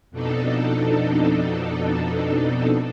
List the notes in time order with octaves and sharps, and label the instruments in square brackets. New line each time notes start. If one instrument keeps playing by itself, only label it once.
[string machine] F2 B2 D4 D#4 A4